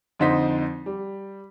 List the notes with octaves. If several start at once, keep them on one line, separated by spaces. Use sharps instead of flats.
F2 D3 D#4 C5 B6
G3